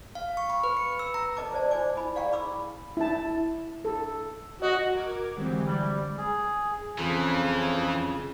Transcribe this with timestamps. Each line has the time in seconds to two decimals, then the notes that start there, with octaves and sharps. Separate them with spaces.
0.15 F5
0.37 C#6
0.50 B5
0.64 B4
0.77 C#7
0.99 E6
1.14 A#5
1.37 A4 B4 D#5 A5 D6
1.52 G#4 C5 D5 A5
1.71 F4 C5 D5 G#5 D6
1.97 E4 D#5 G#5 B5
2.15 G#4 D5 F5 G5 A#5 C#6
2.32 G#4 B5 C6 D6 E6
2.97 E4 A5
3.85 A4
4.62 F#4 D#5
4.92 A#4 D6 G#6
5.36 D3 E3 F#3 G#3 C4 G4
5.66 G3 D6 F#6 G#6
6.18 G#4
6.98 F2 C#3 E3